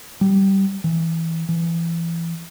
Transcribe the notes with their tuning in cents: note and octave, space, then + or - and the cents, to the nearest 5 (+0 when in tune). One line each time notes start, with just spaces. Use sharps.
G3 -15
E3 -10
E3 +25